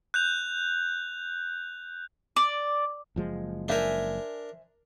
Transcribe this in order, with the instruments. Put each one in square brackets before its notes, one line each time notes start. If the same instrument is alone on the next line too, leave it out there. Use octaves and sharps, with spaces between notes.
[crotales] F#6 G6 F7
[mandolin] D5
[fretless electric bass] F#1 F3 G#3
[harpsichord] D4 A#4 [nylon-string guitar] C5 E5 G#5